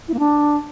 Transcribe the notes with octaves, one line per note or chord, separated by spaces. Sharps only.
E4
A#3
D4